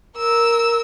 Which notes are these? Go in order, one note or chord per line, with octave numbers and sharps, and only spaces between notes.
A#4 E6